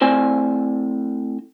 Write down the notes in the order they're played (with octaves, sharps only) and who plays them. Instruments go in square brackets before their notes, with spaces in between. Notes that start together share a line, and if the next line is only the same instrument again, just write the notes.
[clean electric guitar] A2 C4 C5 D5 G#5